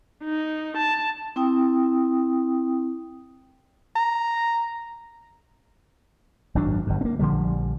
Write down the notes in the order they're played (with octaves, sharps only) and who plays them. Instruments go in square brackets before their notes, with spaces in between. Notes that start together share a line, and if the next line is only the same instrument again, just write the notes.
[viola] D#4
A5
[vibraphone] C4 E4 G5 D#6
[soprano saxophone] A#5
[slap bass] G#1 F#2 F#3 D4
G1 G2
A#3 C4
A#1 D3 F3 G3